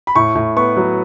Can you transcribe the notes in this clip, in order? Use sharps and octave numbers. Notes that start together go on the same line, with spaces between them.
B5
A2 C#6
A2
B3 C#6
F#3